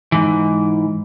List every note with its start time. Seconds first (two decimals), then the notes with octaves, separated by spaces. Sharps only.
0.12 G#2 E3